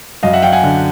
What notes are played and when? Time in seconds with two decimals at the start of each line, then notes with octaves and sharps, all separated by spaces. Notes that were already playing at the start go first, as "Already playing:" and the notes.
0.23 F#2 D#5 F5
0.33 E5 F#5
0.43 F#3 F5 G5
0.53 F#5 G#5
0.63 D3